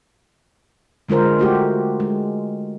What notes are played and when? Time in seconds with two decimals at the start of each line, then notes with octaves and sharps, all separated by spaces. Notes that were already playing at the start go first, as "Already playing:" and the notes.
1.09 D3 G#3 F4 A#4 C5
1.39 A3 F#4 G4
2.00 G#3